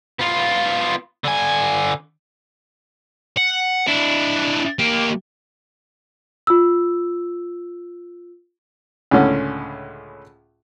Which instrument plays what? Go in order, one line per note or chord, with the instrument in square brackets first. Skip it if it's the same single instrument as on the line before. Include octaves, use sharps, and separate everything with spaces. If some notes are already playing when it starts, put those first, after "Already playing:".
[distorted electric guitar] B3 F4
D3 G#5
F#5
D4 E4
A#3 G4
[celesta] F4 E6
[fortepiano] C#2 A2 D3 C#4